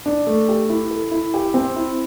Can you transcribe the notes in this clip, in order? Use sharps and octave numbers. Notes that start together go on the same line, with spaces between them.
D4
A3
G4
E4
A4
E4
G4
C4
E4